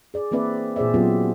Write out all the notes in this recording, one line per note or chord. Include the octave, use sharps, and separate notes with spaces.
G#4 D5
E3 A#3 C4 B4 D5 E5
A#2 E3 G#4 C5 D5 E5
F#3 B3 C#4 F4 G4